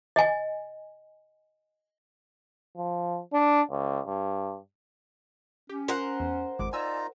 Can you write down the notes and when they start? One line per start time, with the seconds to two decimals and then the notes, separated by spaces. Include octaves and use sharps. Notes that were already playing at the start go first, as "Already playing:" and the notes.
0.16 D#5 G#5
2.77 F3
3.33 D4
3.71 C#2
4.06 G2
5.69 C#4 G4
5.88 F4 A#4 C5 F#5
6.20 E2
6.59 G#1 F2 G#3 D6
6.73 D#4 F4 D5 G#5 A#5 E6